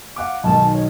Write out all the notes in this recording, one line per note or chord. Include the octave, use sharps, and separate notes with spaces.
F5 F#5 D6
B1 B2 D#3 A5
C#5